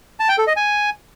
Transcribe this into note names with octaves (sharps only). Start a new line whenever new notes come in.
A5
G5
A4
D#5
G#5